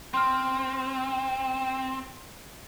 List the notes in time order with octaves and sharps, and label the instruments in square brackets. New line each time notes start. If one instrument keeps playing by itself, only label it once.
[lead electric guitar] C4 [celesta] C6 F6